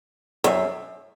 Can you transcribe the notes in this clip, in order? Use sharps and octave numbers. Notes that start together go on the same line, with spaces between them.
F#2